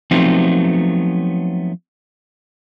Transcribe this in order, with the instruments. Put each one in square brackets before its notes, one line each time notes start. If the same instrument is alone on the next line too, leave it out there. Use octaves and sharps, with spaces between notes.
[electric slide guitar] F3 F#3 A3 B3 C4 D#4